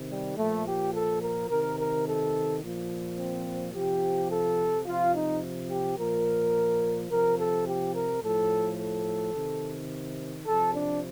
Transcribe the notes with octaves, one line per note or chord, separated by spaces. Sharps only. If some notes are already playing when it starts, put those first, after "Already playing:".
Already playing: C3 D#3
G3
A#2 F3 A3
G4
A4
A#4
C3 D#3 A#4
A#4
A4
A#2 F3
C4
C3 F3 G4
A4
C3 F3 F4
D#4
G4
A#2 F3 A#4
C3 F3 A#4
A4
G4
A#4
A2 F3 A4
A4
C3 D#3
C3 F3 A4
D4